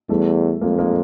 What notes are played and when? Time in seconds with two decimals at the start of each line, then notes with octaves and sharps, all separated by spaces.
0.09 E2 G3 A3
0.61 F2 G#3 A#3
0.78 G#3 A#3